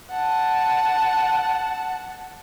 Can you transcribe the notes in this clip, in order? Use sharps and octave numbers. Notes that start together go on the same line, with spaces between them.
F#5 A5